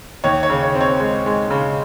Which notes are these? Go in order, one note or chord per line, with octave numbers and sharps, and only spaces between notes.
D#2 C#5
C#5
C#3
C#5
C4
C#5
G#3
G#3
C#3